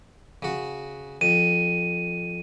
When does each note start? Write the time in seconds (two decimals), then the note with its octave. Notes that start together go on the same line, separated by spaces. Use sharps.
0.42 C#3 F#4
1.21 F2 D#7